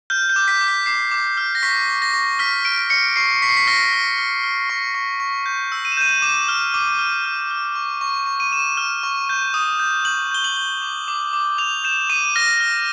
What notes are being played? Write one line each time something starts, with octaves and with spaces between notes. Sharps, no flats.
F6 G6
G6
D6
B6
D6
B6
D6 C7
D6
F6
A#6
C#6 B6
C#6
A#6
C#6
F6 B6
F6 D7
F6 C#7
C#6 C7
C#6 B6
C7
B6
F6 A#6
F6
F6
F6
C#6
C#6
C#6
G6
E6
D#7
E7
G6 D#7
D6 E7
F6
D6
F6
F6
F6
C#6
C#6
C#6
D#7
C#6 E7
F6
C#6
G6
D#6
G6
G6 F#7
G6 G7
F#7
G6
D6
D6
D6
G6 F7
G6 E7
D6 D#7
F6 A#6
F6